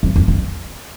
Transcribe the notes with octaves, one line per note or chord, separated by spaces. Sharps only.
F2
F2
F2